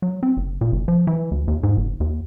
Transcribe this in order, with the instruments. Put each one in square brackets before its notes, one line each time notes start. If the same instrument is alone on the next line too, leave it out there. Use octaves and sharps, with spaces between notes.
[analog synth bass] F#3
C4
F#1
A#2
F#1
F3
E3
D2
D#2
G#2
F#1
D#2